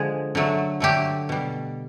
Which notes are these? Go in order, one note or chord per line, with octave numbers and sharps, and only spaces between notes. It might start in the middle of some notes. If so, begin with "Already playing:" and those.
Already playing: D3 F3 G#3 G#4
D3 F#3 A3
D3 F#3 A3 G4
B2 G3